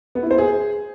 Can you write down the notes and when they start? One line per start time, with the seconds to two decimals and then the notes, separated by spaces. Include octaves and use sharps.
0.15 B3
0.23 E4
0.31 C5
0.38 G#4